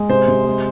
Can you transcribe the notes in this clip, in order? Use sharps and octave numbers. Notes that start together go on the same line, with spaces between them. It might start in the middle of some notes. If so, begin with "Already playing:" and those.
Already playing: G#3
C3 C5
C3
G#3